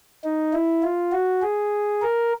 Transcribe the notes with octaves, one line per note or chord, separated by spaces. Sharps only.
D#4
E4
F4
F#4
G#4
A#4